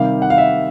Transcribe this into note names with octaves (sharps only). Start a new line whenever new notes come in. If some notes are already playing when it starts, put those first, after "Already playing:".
Already playing: C3 D#3 G3 F5
F#5
F5
E5